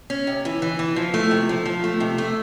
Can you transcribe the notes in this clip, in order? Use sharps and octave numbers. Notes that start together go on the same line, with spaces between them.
C#4
C3
E3
E3
E3
F3
A3
C3
F3
F3
A3
C3
A3